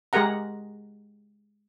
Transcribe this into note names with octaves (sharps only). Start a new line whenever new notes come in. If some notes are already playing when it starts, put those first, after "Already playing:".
G#3 G4 G#4 A#4 F#5 A#5